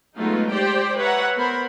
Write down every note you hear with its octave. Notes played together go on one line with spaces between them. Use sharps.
F#3 G#3 A3 B3 D#4 F4
G4 C5 D5 G5
B4 C#5 E5 F#5 A#5
B3 A#4 C5 B5